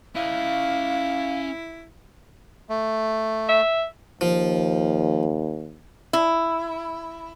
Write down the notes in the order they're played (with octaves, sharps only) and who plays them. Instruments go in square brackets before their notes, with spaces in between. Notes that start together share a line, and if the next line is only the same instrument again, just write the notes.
[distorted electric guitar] C#4 D#5 [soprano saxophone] E4 [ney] F5
[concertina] A3
[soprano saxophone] E5
[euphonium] D#2 [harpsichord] F3
[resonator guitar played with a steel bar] E4